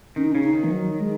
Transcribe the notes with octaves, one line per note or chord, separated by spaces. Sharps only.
D#3 C#4
D#4
C#3 C#4
D#4
D#3
E3
F#3
G#3